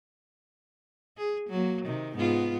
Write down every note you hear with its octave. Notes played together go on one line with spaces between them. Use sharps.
G#4
F#3 A#3
C3 D#3
G#2 B3 F4